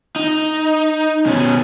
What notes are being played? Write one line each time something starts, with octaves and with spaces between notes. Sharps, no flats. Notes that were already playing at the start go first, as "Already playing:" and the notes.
D#4
B2 C#4